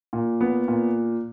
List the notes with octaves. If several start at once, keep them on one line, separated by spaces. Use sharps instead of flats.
A#2
B3
A#2